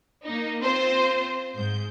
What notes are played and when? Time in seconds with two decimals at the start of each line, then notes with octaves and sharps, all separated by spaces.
0.24 A#3 D#4
0.61 C4 F4 C5
1.55 G#2 G6